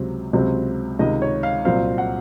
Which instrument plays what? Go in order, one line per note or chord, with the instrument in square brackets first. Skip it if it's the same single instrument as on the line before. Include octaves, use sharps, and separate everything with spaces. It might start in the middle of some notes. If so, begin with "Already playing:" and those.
Already playing: [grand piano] C#2 C3 F#3 C4
C#2 C3 F#3 C4
C#2 C3 D#3 D#5
C#5
F5
C2 A#2 F#3 C4 F5
F#5